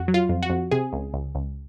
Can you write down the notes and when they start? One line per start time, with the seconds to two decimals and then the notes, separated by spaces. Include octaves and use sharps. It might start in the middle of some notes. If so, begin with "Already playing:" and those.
Already playing: F2 F#4
0.08 F#3
0.14 F4
0.29 F2
0.43 F#4
0.50 F2
0.71 C3 G#4
0.92 C#2
1.14 C#2
1.35 C#2